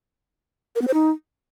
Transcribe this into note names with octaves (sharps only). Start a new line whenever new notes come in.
A#4
B3
C5
D#4